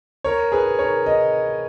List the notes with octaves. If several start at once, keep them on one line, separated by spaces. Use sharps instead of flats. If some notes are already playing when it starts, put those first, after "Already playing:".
A#4 C#5
G#4 B4
A#4 C#5
D#5